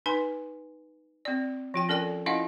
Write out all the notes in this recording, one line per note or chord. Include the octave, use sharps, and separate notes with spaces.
D#4 B4 G#5 C6
C4 D5
F3 F4 G5
C#4 A4 A#4 D5 G5
C#4 E4 F4 D#5 F5 F#5